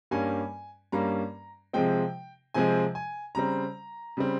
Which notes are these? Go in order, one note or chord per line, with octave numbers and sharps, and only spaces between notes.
G2 G3 A#3 C#4 G#5
G2 G3 A#3 C#4 A#5
C3 F3 G#3 C4 G5
C3 F3 G#3 C4 G#5
G#5
C#3 G3 C4 A#5
C#3 G3 C4